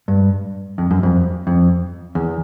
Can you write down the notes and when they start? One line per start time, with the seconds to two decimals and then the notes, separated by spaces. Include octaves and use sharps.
0.08 G2
0.78 F2
0.91 F#2
1.03 F2
1.47 F2
2.15 E2